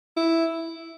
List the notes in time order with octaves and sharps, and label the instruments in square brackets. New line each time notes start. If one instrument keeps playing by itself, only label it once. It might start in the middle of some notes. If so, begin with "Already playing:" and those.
[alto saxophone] E4